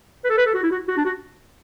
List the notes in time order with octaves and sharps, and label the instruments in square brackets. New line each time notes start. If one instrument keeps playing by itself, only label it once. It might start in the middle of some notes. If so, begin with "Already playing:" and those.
[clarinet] B4
A4
B4
A4
F#4
E4
F#4
F#4
D4
F#4